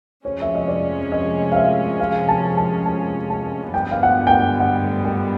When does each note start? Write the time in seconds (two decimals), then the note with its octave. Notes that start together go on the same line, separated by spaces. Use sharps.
0.25 F2 C3 F3 G#3 C#4 C#5
0.42 E5
0.55 D#5
0.68 D5
1.12 D#5
1.52 F5
1.56 E5
2.00 F5
2.29 A5
2.57 A5
2.86 A5
3.30 A5
3.74 G2 D3 G3 B3 G5
3.91 F5
4.03 F#5
4.27 G5
4.31 F#5
4.60 F#5
5.05 G5